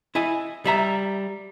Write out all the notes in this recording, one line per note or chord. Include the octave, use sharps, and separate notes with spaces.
E4 D#5 G#5
G3 E5 A#5